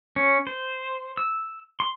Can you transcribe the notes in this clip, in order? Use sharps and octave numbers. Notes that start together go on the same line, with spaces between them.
C#4
C5
E6
C6